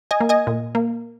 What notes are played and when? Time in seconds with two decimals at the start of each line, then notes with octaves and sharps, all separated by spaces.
0.11 D#5 G#5
0.20 A#3
0.29 D#5 G#5
0.47 A#2
0.75 A#3